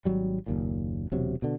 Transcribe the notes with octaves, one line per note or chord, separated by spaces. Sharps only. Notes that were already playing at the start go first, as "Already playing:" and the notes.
G#1 F#3 G3
F#1 D#2 A#2
E1 C3 F#3
B2 D3